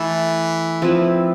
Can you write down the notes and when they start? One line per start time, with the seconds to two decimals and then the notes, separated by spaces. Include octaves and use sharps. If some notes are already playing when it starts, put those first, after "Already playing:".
Already playing: E3 A3 E4 A4
0.82 F3 C4 E4 B4